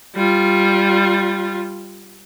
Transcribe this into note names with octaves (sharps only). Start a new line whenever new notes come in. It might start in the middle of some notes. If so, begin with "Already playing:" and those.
G3 F4